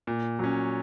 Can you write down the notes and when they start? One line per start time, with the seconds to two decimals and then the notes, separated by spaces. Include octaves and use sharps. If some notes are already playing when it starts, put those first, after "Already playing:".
0.07 A#2
0.39 F#3 C#4